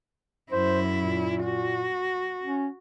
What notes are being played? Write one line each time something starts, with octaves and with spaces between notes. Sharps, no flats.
F#2 E4 C5
A#2
F#4
C#4